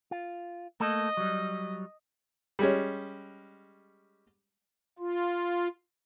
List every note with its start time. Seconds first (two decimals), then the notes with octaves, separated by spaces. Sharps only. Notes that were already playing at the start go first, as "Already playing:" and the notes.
0.11 F4
0.80 A3 A#3 A4 D#5
1.17 F#3 G3
2.59 G3 G#3 C#4
4.99 F4